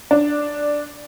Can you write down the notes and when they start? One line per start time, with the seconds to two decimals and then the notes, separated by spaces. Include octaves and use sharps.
0.11 D4